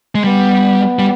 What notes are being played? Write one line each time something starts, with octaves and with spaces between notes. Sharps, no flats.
G#3
G3 B3
G3